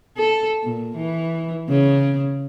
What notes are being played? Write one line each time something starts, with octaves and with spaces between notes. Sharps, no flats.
A4
A#2
E3
C#3